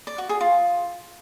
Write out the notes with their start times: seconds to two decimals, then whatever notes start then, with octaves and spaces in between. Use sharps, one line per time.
0.07 D5
0.18 F#4
0.29 G#4
0.41 F4